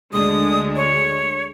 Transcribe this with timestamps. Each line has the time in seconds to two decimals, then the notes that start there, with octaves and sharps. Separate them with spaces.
0.13 D2 D3 G#3 D#6
0.76 C#5